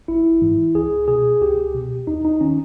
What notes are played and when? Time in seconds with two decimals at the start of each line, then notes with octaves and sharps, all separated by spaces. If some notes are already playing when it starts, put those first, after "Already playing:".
0.08 G#1 E4
0.42 G#2 E3
0.75 C#2 G#4
1.08 B2 G#4
1.41 C#2 G4
1.74 B2
2.07 D#2 D#4
2.25 D#4
2.41 D#3 C#4